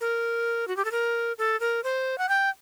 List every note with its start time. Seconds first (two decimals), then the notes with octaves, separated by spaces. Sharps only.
0.01 A#4
0.68 F#4
0.77 G4
0.85 A4
0.92 A#4
1.38 A4
1.60 A#4
1.84 C5
2.18 F#5
2.29 G5